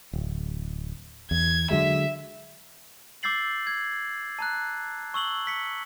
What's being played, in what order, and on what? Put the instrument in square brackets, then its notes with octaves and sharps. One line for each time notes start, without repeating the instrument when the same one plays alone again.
[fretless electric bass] D1
[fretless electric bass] E2 [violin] G#6
[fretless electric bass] D3 F#3 G#3 [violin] E5
[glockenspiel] D6 E6 G6 A6 C7 F#7
G#6
A5 A#5 F#6
C#6 E6 F#7 G7
B6 C#7